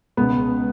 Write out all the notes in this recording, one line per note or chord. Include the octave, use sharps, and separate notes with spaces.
C#2 B2 B3